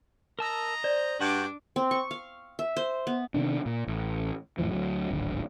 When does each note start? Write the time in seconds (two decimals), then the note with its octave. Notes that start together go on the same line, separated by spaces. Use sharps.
0.39 A#4 D#5 A5 A#5 E6
0.84 C5 D5
1.21 G2 D4 F#4 F#5 D6 G6
1.76 C4
1.91 C#6
2.11 F5
2.59 E5
2.77 C5
3.07 B3
3.34 C3 D#3 B3 D4
3.66 A#2
3.88 A1
4.58 F2 A2 E3 F3
4.71 D2 F#3
5.11 D1 G#1 D3